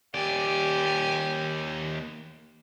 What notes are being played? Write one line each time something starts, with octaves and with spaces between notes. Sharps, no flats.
D#2 G4 D5 G#5